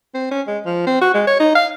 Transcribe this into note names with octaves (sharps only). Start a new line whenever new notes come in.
C4
C#4
G#3
F3
C4
F#4
G#3
C#5
D#4
F5